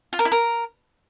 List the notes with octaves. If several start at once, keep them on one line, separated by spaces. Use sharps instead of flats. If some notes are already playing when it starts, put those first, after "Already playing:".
F4
A#4
E4
A#4